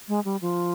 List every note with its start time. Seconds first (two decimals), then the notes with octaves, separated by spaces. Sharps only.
0.08 G#3
0.25 G3
0.42 F3